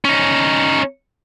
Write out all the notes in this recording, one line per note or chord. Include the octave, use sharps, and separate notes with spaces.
C#4 D#4